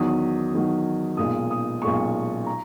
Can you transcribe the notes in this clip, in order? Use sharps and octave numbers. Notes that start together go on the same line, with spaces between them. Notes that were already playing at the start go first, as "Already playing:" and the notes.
Already playing: E2 D#3 F#3 D#6
E2 D#3 F#3
B1 A#2 G#3 D#6
D#6
B1 A#2 G#3 C#6
A#5